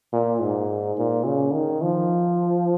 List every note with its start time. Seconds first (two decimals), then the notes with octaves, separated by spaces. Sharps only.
0.13 A#2
0.41 G#2
0.98 A#2
1.26 C#3
1.54 D#3
1.82 F3